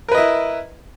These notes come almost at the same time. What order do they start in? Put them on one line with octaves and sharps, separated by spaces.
A#4 B4 D#5 E4